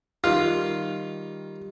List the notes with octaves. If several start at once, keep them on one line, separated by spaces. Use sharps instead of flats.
D#3 G3 F4